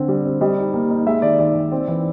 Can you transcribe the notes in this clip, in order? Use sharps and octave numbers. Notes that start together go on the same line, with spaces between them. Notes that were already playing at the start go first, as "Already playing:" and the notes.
Already playing: D3 C4
G3
C4
G3 D#5
D#4
A#3
D#4
G#3 E5
D#3 D5
D#3 D5
D#3
C4
E3